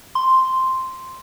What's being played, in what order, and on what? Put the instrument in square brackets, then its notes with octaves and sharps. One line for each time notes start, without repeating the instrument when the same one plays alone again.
[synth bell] C6